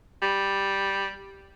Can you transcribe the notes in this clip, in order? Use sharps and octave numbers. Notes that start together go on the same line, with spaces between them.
G3